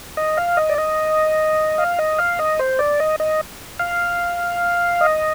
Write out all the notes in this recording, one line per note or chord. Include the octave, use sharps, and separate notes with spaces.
D#5
F5
D#5
D5
D#5
F5
D#5
F5
D#5
C5
D5
D#5
D#5
F5
D#5